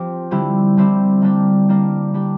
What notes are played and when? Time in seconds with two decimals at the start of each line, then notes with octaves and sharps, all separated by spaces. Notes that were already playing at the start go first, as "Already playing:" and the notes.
Already playing: F3 C4 G4
0.31 D3 G3 C4 E4 G4
0.77 D3 G3 C4 E4 G4
1.22 G3 A#3 D4 G4
1.69 G3 A#3 D4 G4
2.14 G3 D4 G4